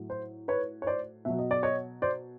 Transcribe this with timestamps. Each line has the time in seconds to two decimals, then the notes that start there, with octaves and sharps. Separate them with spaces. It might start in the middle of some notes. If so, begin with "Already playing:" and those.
Already playing: A2 F#3
0.10 C5
0.48 B4 C#5
0.82 C#5
0.87 C5 D5
1.25 B2 F#3 E5
1.39 D#5
1.51 D5
1.63 C#5 D#5
2.02 C5 D5